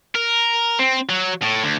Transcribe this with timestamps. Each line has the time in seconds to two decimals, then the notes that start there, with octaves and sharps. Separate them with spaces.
0.15 A#4
0.79 C4
1.09 F#3
1.42 A2
1.64 D2